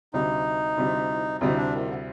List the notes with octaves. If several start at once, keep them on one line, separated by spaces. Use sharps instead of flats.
D2 C3 G3 D#4
D2 C3 G3
D2 C3 G3 D#4
D4
D#3
D3